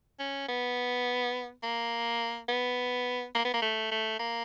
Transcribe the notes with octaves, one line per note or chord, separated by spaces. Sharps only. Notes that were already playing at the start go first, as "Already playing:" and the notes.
C#4
B3
A#3
B3
A#3
B3
A#3
A3
A3
A#3